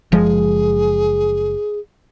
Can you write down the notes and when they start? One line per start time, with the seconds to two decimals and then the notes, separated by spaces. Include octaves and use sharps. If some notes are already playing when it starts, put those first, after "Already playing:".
0.12 F#1 F3 G#3 G#4